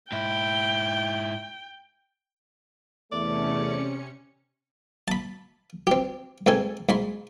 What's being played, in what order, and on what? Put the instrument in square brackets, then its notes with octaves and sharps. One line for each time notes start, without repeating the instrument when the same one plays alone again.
[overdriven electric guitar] G#2 E4 [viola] G5
[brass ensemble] E2 A3 [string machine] C3 C#4 C#7 [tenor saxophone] D5
[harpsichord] A5 B5
C4 G4
G#2 C4 A4 G#5
G#2 B5 C6